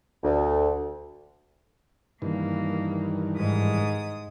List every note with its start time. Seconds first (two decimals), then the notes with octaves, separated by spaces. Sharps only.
0.24 D2
2.22 G2 D#3 E3 A#3
3.35 G#2 D#6